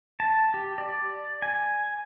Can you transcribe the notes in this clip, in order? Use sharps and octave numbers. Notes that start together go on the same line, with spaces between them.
A5
G4
D5
G#5